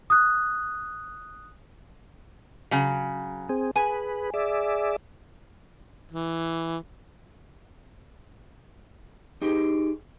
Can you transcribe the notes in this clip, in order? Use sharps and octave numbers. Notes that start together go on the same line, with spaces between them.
D#6 F#6
C#3 F#3
C4 G#4
G#4 B4 G#5
G#4 D5 E5
E3
D#4 G4 G#4